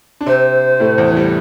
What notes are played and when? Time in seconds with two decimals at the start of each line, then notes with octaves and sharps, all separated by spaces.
0.21 D4
0.26 C3 C4 C5
0.80 A2 A3
0.98 E2 E3
1.11 E3
1.17 G3